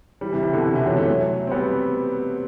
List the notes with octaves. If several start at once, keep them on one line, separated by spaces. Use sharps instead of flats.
E3 G3
C3 E3
C3
B2 D3
C3 E3
C3 E3
D3 F#3
F#3 A3
F#3 A3
C4
G3 B3